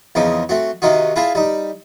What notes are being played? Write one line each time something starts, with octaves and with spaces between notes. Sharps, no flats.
E2 C#3 F3 C4 D#4
A3 C4 F#4
C3 D#3 D#4 F4 F#4
E4 F4 G#4 F5 A5 B5
G3 D#4